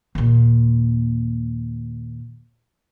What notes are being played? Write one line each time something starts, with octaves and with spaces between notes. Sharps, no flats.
D#2 A#2